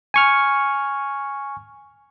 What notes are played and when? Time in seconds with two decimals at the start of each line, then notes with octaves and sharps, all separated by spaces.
0.14 G#5 C#6 F6